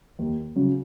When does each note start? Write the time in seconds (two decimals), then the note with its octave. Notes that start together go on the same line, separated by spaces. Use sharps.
0.19 D#2
0.56 C#3 F#3